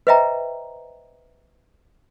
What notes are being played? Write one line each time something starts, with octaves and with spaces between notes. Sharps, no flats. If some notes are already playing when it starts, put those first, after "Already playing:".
B4 C5 D#5 E5 G5 A#5